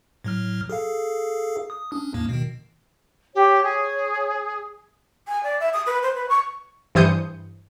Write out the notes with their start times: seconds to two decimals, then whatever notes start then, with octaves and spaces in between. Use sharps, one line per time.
0.24 A2 F#3 F6
0.69 G#4 A4 F5
1.70 D#6
1.92 C#4 D4
2.14 E2 A2 A#3
2.29 B2 D#3
3.35 G4 C#5
3.63 G#4
5.27 G#5
5.43 D5
5.60 E5
5.73 D#6
5.86 B4
6.02 C5
6.14 B4
6.28 C#6
6.95 G2 E3 C5 D#6 G6 C#7